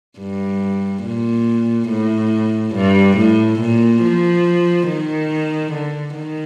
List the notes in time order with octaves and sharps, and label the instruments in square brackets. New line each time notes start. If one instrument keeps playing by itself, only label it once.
[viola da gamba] G2
A#2
A2
G2
A2
A#2
F3
D#3
D3
D#3